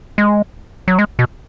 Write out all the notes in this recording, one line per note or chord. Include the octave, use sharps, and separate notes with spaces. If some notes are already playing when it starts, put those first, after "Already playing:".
G#3
F#3
G#3
B2